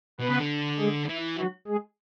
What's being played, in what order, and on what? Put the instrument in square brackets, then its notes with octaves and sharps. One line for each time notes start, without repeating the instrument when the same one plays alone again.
[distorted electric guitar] B2 [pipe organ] B3 B4
[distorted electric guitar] C#3
D3
[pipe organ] G#3 G#4
[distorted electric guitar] E3 [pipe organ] E4
[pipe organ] F#3 F#4
G#3 G#4